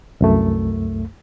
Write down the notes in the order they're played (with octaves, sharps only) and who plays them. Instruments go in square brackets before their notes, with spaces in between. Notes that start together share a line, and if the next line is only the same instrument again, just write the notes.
[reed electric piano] C2 F#2 A3